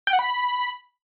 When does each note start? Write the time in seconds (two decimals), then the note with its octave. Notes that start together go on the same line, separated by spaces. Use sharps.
0.07 G5
0.13 F#5
0.19 B5